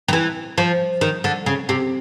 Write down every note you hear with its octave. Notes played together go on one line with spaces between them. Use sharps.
D#3
E3
F3
D#3
D3
C#3
C3